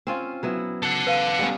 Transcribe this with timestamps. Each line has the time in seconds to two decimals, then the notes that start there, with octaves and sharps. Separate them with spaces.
0.07 C4 C#4 F4
0.43 F#3 B3 E4
0.83 A4 F#5
1.07 B4 F5 D#7
1.39 G3 B3 C#4